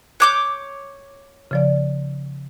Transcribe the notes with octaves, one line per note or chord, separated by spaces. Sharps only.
C#5 D6 F#6 G6
C#3 F3 D5